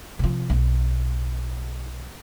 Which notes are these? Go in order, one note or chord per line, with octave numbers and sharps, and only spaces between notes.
C3 F3
B1